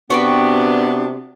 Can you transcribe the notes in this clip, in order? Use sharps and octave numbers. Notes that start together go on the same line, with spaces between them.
C3 B3 D4 F#4 B4 G5